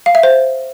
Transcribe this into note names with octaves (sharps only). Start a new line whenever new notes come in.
F5
E5
C5